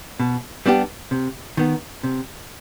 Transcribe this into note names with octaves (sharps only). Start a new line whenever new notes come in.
B2
G3 B3 D4 G4
C3
D#3 B3
C3